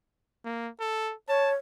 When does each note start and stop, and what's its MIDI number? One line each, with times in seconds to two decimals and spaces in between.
0.45 0.69 58
0.80 1.13 69
1.29 1.55 73
1.29 1.50 81